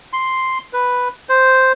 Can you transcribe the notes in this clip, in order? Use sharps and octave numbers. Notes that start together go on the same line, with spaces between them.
C6
B4
C5